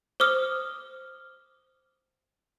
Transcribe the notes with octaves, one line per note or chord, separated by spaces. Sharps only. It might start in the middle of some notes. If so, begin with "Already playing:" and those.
C5 D6 D#6 F6